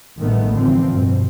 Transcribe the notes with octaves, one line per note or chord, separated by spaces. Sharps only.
A1 D#3 G3 A3 B3
D3 E3 F3 C4
G2 B2